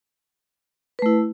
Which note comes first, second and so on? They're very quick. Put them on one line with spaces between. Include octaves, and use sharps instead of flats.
B4 A3 E4